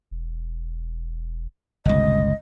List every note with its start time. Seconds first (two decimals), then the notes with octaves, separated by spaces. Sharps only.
0.11 E1
1.85 G1 C#2 C3 D#5